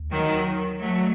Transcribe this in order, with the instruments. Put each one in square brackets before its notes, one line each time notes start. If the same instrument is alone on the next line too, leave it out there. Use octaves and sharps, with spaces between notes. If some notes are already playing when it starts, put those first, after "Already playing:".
Already playing: [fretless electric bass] D#2
[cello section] D#3 F#3
F#3 A3